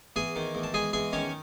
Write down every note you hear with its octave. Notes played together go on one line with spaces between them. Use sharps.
E2 G#4 G#5
D#3
E2
A5
G#3 G#4 G#5
E2 G#4 G#5
D#3 C#4 C#5